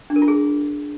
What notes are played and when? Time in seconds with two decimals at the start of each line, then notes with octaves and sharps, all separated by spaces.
0.10 D4
0.16 A#4
0.22 F4
0.28 G#4